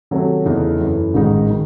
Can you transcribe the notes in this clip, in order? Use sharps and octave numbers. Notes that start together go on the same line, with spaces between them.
C3 D#3 F#3 A3 C#4
E2 C#3 E3 A3 D#4
F#2 E3 A3
A1 G#2 D#3 G#3 D#4
D#3